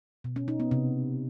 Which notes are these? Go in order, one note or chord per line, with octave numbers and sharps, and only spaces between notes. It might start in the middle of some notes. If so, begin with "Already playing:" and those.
B2
C#4
D#4
B3
C3